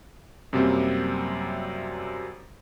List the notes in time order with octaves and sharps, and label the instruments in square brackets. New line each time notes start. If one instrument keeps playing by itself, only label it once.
[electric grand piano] F#2 C3 F#3 G3 A#3 C4